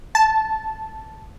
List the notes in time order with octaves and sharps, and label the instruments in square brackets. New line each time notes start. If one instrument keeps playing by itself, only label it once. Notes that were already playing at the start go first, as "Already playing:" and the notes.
[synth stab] A5